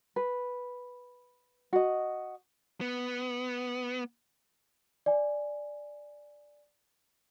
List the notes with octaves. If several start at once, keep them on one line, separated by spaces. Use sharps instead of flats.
B4
F#4 D#5
B3
D5 G#5